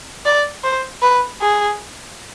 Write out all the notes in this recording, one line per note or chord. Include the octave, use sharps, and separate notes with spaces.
D5
C5
B4
G#4